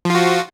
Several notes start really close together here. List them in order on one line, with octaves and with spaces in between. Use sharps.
F3 F4 F#4